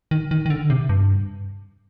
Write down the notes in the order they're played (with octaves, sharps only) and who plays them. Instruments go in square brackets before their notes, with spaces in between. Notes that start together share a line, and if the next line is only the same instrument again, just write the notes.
[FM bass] D#3
D#3
D#3
D3
C3
G2